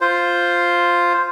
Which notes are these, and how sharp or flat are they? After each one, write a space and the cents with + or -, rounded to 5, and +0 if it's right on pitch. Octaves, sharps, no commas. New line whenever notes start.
F4 +0 C5 +0